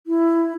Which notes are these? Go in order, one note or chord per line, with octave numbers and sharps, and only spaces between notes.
E4